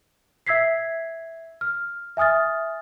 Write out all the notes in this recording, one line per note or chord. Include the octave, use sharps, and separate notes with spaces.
E5 E6 G#6 B6 C7
F6
E5 G#5 D#6 F6 A6